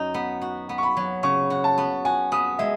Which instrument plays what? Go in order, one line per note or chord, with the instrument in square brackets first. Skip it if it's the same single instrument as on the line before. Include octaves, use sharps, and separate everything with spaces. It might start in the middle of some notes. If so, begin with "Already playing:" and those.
Already playing: [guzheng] F#2 D#4
B3
F#4
B3
[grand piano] C#6
B5
[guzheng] F#3
[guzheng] C#3 [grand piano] C#6
[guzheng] F#4
[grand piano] A5
[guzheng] B3
[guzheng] F#4 [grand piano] G#5
[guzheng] B3 [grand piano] D#6
[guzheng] G#3 [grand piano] E5